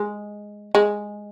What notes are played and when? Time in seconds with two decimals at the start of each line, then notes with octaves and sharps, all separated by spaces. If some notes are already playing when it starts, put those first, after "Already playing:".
Already playing: G#3
0.75 G#3